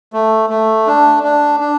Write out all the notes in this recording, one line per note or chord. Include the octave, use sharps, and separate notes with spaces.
A3
A3
D4
D4
D4